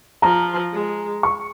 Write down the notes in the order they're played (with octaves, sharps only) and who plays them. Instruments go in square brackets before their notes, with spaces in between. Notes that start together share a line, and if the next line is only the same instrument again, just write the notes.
[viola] F3 [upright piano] A#5
[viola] G#3
[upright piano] C#6